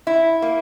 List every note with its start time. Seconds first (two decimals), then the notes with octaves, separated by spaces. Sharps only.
0.07 E4
0.42 A#3